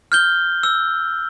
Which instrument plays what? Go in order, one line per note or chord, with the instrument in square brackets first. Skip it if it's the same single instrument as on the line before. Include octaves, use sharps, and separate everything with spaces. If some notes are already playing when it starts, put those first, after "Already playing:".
[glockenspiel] F6 G6 G7
E6